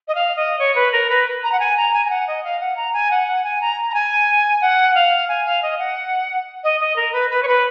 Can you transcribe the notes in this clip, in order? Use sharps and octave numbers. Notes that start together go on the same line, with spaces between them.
D#5
F5
D#5
C#5
B4
A#4
B4
A#5
F#5
G#5
A#5
G#5
G#5
F#5
D#5
F5
F#5
A#5
G#5
F#5
F#5
G#5
A#5
A#5
G#5
F#5
F5
G#5
F5
D#5
F#5
D#5
D#5
A#4
B4
B4
C#5
B4